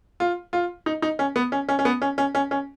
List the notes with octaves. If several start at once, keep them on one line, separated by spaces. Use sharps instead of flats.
F4
F4
D#4
D#4
C#4
B3
C#4
C#4
C#4
B3
C#4
C#4
C#4
C#4